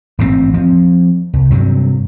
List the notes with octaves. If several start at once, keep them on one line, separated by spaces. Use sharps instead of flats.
A1 G#2 B2 C4
F3 C4
C2
G2 C3 E3 F#3